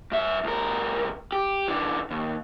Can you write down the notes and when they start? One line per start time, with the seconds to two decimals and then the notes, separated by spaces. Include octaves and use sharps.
0.12 G2 E5
0.44 C#2 A#4
1.32 G4
1.68 D3 E3
2.11 D#2